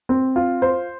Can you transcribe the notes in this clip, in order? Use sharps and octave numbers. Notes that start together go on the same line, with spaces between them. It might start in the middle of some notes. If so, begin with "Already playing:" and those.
C4
F4
C5